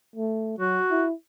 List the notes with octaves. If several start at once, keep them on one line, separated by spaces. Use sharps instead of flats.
A3
F#3 F#4
E4